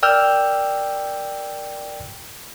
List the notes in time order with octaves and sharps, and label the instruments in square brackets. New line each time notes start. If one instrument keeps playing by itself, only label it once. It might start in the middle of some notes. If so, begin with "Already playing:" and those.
[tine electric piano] A#4 D5 G5 E6 F6 G6